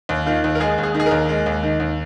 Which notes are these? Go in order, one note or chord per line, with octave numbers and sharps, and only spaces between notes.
D#2
D#3 F4
D#2
A#4
G#3 G#4
D#2
G#4
D#3
G#4
A#4
D#2
G#3
D#2
D#3
D#2